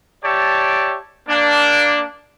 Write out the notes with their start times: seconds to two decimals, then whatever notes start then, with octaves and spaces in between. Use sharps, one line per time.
0.23 G4 C#5 D5 E5 A5
1.28 A#3 D4